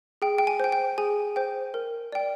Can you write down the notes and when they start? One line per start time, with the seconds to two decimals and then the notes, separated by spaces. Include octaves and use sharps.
0.22 G#4 G5
0.38 G5
0.47 G#5
0.60 C5 G5
0.72 G5
0.98 G#4 G#5
1.36 C5 G5
1.74 A#4
2.12 D5 G5